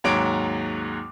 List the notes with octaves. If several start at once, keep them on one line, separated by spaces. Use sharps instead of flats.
D#2 G#2 F#3 C#5 D6 D7